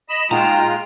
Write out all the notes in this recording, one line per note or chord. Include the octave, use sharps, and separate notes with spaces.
D#5 B5 E7
A#2 G#3 D#4 F4 F#4 G5 A#5